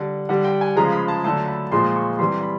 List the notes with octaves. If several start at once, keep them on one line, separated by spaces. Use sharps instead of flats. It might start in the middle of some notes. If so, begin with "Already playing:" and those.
Already playing: D3 G3
D3 G3 F#5
G5
G#5
C#3 F3 G#3 A#5
B5
A5
D3 F#3 A3 A5
B5
A#2 F3 G#3 C6
C#6
C3 E3 G3 C6
B5